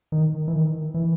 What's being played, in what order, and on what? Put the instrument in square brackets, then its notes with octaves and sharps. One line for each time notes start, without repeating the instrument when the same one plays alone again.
[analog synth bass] D#3
E3
D#3
E3